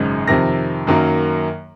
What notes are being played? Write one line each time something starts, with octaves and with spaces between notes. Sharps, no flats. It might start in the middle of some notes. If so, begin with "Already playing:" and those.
Already playing: G#1 F#2 C#3 G#3 D#4
F2 C3 D#3 A#6
F#2 D#3 F#3 A#3